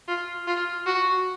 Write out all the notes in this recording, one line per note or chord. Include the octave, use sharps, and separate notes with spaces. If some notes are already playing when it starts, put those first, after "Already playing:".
F4
F4
F#4